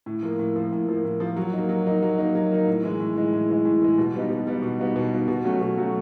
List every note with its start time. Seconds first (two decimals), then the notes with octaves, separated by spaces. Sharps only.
0.06 A2
0.23 F3 A#3
0.39 A2
0.56 F3 A#3
0.72 A2
0.88 F3 A#3
1.04 A2
1.20 F3 A#3
1.36 F#3
1.53 A#3 D#4
1.69 F#3
1.87 A#3 D#4
2.02 F#3
2.18 A#3 D#4
2.35 F#3
2.52 A#3 D#4
2.67 A2
2.83 E3 G#3
3.00 A2
3.16 E3 G#3
3.33 A2
3.49 E3 G#3
3.65 A2
3.82 E3 G#3
3.98 B2
4.14 G3 B3 D#4
4.30 B2
4.47 G3 B3 D#4
4.62 B2
4.79 G3 B3 D#4
4.96 B2
5.12 G3 B3 D#4
5.28 B2
5.44 F#3 A3 C#4 F#4
5.61 B2
5.78 F#3 A3 C#4 F#4